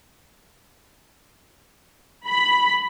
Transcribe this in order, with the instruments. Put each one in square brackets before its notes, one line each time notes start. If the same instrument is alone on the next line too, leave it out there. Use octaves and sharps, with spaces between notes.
[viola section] B5